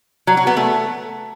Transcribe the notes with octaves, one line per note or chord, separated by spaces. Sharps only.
F#3
F#4
B3
A3